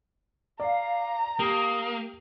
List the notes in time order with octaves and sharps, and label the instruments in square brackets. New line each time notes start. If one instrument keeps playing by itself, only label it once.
[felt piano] D5 [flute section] F5 [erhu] A#5
[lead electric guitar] A#3 [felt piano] G4 [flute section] D#6